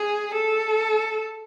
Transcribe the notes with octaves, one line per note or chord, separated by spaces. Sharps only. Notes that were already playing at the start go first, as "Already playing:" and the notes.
Already playing: G#4
A4